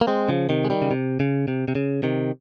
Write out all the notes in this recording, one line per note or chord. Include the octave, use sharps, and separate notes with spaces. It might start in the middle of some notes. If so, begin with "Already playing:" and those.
A#3
G#3 C4
C#3 F3
C3 D#3
G#3
D#3 G3
C#3
C3
C#3
C3
C3
C#3
C3 D#3